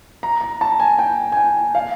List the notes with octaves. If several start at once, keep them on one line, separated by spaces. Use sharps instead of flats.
A#5
A#5
A5
G#5
G5
G#5
G5
F5